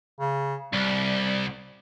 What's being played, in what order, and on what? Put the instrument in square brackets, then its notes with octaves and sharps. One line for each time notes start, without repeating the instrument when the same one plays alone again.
[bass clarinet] C#3
[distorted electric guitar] C2 [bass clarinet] G3